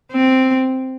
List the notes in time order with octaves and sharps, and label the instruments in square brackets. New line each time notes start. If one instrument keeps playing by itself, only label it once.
[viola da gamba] C4